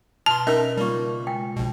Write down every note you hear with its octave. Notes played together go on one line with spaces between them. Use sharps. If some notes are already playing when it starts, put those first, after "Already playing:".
B2 A5 C6 F6
C#4 D#4 A#4 D#5 E5 E6
C#3 G3 A#3 F4 C#6
G#3 G5
A#1 B2